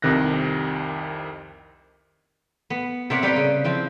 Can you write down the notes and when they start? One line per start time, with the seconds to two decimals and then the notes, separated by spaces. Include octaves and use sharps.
0.02 C2 F2 C3 D#3 F#6 A#6
2.70 B3
3.10 C3 C4 A#4 C#5 E5 F#5
3.23 G3 C4 B4 F5 G5
3.36 C#3
3.64 F3 C4 E4